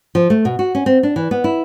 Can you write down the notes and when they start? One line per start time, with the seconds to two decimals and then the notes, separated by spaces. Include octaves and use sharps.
0.15 F3
0.30 A3
0.45 B2
0.59 F#4
0.75 C#4
0.86 C4
1.03 D4
1.16 E3
1.31 B3
1.44 E4